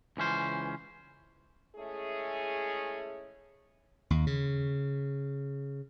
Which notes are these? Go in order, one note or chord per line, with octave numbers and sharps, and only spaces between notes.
C#2 E3 C#4 C5
G#3 A3 C#4 E4 G#4
D#2
C#3